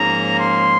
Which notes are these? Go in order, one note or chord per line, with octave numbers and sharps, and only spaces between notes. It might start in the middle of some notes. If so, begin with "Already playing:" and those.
Already playing: G#2 F3 A#3 C#4 A#5
C6